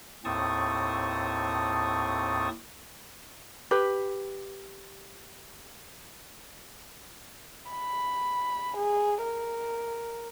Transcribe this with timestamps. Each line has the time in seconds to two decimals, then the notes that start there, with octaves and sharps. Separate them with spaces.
0.25 D#2 A2 C4 A5 C#6 D#6
3.71 G4 B4
7.70 B5
8.77 G#4
9.23 A#4